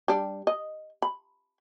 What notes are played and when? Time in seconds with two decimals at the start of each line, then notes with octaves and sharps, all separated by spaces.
0.08 G3 D4
0.47 D#5
1.02 B5